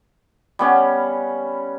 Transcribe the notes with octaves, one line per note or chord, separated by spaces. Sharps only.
G3 B3 C#4